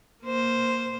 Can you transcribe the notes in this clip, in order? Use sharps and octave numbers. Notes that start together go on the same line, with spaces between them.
A#3 C5